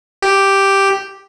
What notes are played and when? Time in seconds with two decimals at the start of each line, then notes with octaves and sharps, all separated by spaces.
0.22 G4